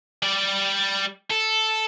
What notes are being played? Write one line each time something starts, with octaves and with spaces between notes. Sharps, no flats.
G3 D5
A4